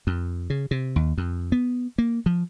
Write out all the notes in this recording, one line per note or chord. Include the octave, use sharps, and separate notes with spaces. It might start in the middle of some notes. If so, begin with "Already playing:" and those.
F2
C#3
C3
D#2
F2
B3
A#3
F3